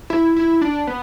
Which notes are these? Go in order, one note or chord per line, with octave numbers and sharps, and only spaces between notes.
E4
E4
D4
B3